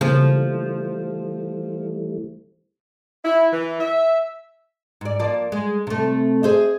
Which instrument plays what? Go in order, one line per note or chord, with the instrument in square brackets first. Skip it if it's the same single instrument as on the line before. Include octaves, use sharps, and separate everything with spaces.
[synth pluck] C#3 A#3 [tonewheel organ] E3 G3 A3 [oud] F3
[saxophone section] E4
E3
E5
[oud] G#2 D5
F3 A#3 D5
G#3
C3 A3
G#4 C5 E5